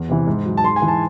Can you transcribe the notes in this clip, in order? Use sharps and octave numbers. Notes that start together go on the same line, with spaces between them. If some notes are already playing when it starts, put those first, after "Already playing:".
Already playing: E2
C3 E3
G#2
F#3
A5
G#2 C6
G#5
E3
A5